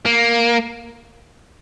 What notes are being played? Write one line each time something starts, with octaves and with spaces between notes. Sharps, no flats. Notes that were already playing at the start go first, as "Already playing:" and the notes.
A#3